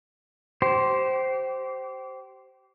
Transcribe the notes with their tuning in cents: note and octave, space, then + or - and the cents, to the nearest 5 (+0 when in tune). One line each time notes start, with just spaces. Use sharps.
G4 -30 C5 +0